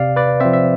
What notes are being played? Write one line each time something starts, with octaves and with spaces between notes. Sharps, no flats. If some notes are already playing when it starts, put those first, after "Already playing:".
Already playing: C3 D5 F5
B4 D5
F3 C4 C5 E5
E5